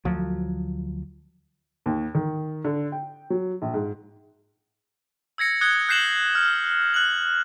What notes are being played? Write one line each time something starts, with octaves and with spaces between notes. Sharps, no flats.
D2 F3 F#3
D#2
D#3
D3
G5
F#3
A#1
G#2
E6 G#6 A#6 C#7
D#6 F#6 G#6 C#7 G7
F#6 G6 C7 E7 F#7 G7
F6
F#6 F#7